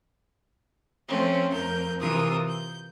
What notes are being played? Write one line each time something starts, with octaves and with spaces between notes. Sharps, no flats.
F3 A3 C4 C#4
F2 A#4 G6
C3 E3 F4 A#4 D#6
G6